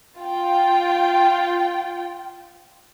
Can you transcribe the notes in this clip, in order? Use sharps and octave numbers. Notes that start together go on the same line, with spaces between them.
F4 G5